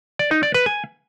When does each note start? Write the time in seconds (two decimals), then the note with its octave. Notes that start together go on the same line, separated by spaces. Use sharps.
0.19 D5
0.31 D#4
0.43 D5
0.54 B4
0.66 G#5